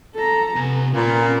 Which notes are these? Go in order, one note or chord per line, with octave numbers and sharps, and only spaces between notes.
A4 A#5
C3 B3 G#5
A#2 C#4 B5